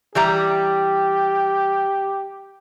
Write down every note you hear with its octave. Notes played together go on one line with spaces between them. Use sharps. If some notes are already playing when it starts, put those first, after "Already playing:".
E3 G3 G4 A#5